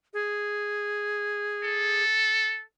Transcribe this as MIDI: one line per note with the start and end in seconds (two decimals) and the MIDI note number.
0.14 2.03 68
1.64 2.63 69